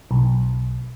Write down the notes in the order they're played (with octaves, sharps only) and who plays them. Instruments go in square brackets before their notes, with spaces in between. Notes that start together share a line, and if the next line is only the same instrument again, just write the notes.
[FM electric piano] B1